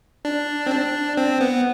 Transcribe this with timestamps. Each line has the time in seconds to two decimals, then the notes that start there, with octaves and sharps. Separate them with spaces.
0.25 D4
0.66 C4
0.72 D4
1.17 C4
1.41 B3